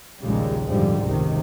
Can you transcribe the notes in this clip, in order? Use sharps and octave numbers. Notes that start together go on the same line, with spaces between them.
A#1 D#2 A#2 C#3 G3 G#3
F2 G#2 D3 F3 G3
F1 C#2 C3 D#3